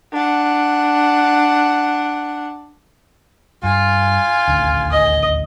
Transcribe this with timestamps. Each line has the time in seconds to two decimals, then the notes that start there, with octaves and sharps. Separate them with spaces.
0.12 D4 F#5
3.63 G2 F4 G#5
4.47 D#1 A1 D2
4.91 D#5